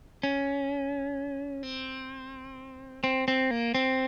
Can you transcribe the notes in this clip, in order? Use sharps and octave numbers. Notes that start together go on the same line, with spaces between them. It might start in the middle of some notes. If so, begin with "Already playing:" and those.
C#4
C4
C4
C4
A#3
C4